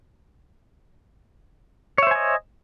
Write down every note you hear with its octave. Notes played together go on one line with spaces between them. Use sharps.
C5 C#5 D#5 E5 G#5